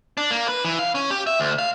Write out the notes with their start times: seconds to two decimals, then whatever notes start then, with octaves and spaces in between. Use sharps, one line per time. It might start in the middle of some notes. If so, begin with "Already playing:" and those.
0.17 D4
0.31 A#3
0.48 B4
0.65 E3
0.79 F5
0.95 C#4
1.11 G4
1.27 E5
1.40 D2
1.59 F5